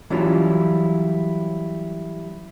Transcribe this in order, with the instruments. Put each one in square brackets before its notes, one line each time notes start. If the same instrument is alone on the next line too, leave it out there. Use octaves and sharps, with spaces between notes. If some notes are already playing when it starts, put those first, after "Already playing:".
[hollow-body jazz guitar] E3 F#3 G3 C#4 E4 F4